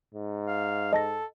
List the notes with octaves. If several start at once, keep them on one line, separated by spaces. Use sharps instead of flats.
G#2
F5
A4 D#5 A5 A#6